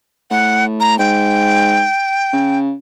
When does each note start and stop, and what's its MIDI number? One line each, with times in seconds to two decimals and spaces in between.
0.31 0.96 45
0.31 0.65 78
0.80 0.97 82
0.99 1.85 44
0.99 2.59 79
2.33 2.73 49